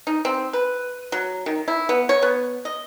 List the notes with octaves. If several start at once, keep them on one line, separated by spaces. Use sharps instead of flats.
D#4
C4
B4
F#3
D#3
E4
B3
C#5
B3
D#5